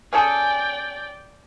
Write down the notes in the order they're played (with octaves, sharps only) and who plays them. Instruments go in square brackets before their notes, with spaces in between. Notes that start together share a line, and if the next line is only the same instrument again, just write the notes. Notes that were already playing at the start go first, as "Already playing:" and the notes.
[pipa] C#4 G#4 A4 [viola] D5 G5